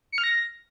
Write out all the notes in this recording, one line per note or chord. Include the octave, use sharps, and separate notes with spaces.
C#7
F6
A#6